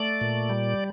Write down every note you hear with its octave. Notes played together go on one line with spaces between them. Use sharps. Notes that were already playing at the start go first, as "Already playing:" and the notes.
Already playing: A3 D5
A#2
G3